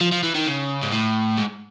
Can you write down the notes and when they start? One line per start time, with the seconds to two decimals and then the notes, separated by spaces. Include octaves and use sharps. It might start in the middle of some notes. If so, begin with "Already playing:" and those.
0.01 F3
0.12 F3
0.23 E3
0.35 D#3
0.47 C#3
0.82 G#2
0.92 A2
1.38 G#2